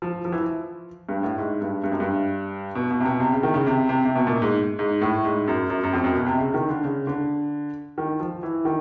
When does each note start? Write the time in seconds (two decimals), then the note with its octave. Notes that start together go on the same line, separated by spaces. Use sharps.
0.02 F3
0.25 F3
0.32 E3
0.41 F3
1.09 G2
1.23 A2
1.38 G#2
1.61 G2
1.84 G2
1.91 F#2
2.00 G2
2.75 B2
2.91 B2
3.00 C3
3.05 B2
3.20 C3
3.32 C#3
3.43 D#3
3.54 C#3
3.66 C3
3.89 C3
4.05 C3
4.15 B2
4.27 A#2
4.42 G#2
4.79 G#2
5.01 A2
5.25 G#2
5.48 F#2
5.70 F#2
5.84 F#2
5.93 F2
6.04 F#2
6.15 B2
6.26 C3
6.38 C#3
6.54 D#3
6.69 D3
6.84 C#3
7.07 D3
7.98 D#3
8.20 F3
8.43 E3
8.65 D#3